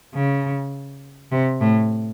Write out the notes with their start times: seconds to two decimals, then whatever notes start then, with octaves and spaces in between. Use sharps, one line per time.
0.14 C#3
1.32 C3
1.61 A2